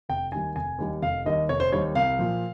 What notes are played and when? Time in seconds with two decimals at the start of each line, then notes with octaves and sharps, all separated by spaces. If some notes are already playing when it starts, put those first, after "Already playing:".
0.09 F1 G5
0.32 D#2 D#3 G3 G#5
0.55 F1 G#5
0.78 D#2 D#3 G3
1.02 F1 F5
1.26 D#2 D#3 G3 D#5
1.49 F1 C#5
1.60 C5
1.72 D#2 D#3 G3 C#5
1.95 C2 F5
2.19 A#2 F3